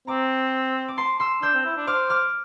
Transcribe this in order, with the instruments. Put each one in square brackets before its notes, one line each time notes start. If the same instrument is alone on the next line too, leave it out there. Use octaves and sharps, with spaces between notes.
[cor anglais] C4 [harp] A#5 D6
[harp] D6
A5 C6
C6 E6
[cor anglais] D4 [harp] E6 G6
[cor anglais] C4
E4
D4
[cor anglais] C5 [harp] D6 F6
[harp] D6 F6